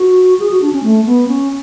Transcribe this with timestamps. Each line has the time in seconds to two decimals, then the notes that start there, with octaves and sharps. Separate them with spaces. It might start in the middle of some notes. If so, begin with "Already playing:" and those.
Already playing: F#4
0.40 G#4
0.51 F#4
0.62 D4
0.73 C#4
0.84 A3
1.05 B3
1.28 C#4